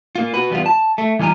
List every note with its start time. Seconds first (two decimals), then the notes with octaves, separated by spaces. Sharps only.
0.16 A#3 F4
0.34 F#4 B4
0.50 E2 G3 B3 F4
0.66 A5
0.98 A3
1.19 E3 G3 F4 G#5 A#5